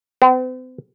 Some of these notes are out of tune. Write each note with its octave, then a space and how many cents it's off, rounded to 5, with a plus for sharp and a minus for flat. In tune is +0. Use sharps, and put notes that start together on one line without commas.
C4 -45